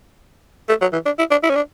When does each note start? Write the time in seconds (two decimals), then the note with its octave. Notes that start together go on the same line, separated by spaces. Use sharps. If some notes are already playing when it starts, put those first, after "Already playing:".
0.69 A3
0.81 F#3
0.93 E3
1.06 D4
1.19 E4
1.31 D4
1.43 E4
1.50 C#4
1.56 D4